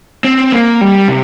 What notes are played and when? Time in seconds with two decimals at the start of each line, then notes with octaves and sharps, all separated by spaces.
0.24 C4
0.52 A#3
0.81 G3
1.08 C3